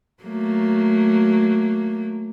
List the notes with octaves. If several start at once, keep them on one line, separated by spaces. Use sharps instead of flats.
F#3 A3 A#3